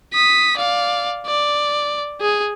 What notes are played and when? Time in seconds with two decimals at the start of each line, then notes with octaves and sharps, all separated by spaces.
0.13 D#6 B6
0.57 D5 F5
1.26 D5
2.21 G#4